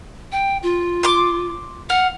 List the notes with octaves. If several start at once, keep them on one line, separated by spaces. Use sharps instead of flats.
G5
F4
C6 D6
F5 F#5